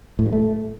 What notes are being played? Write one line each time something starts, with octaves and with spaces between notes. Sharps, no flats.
A2
G2
A3